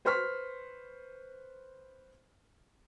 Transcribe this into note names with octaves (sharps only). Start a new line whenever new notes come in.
B4 C5 C6 C#6 F6 B6